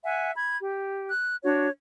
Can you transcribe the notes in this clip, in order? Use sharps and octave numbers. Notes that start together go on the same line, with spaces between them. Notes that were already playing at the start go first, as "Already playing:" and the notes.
E5 F#5 G#5
B5 G#6
G4
F#6
D4 F#4 C#5